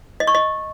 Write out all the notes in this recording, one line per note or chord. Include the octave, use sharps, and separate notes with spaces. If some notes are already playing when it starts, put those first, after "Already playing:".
D#5
C#6
D#5